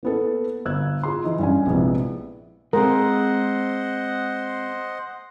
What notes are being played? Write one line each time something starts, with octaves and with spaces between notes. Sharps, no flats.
A#3 B3 A4
G1 E6 F#6 G#6
F4 G#4 C6
E3 D#4
G2 C#4 G#5
A#1 C3 G#3 B3 E4
G#3 C4 G#4 A#4 C5 D#5 F#5